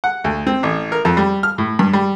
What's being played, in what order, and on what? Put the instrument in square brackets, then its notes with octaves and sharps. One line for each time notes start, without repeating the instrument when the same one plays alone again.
[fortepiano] F#5
D2
C4
A1
A#4
F2
G3
F6
A2
G2
G3